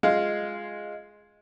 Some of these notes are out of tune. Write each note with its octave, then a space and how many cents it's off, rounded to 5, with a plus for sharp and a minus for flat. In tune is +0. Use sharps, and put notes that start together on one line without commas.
G#3 +0 F4 +0 F5 +0